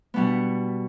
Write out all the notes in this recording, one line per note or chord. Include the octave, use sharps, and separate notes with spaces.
B2 G3 B3 D4 F#5